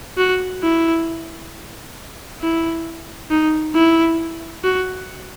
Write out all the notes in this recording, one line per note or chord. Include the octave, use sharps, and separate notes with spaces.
F#4
E4
E4
D#4
E4
F#4